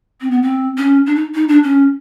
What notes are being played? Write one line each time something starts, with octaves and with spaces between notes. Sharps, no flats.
C4
B3
C4
C#4
D4
D#4
D#4
D4
C#4